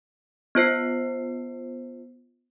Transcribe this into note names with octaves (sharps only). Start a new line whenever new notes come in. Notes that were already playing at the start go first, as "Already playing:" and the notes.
B3 F4 C5 C7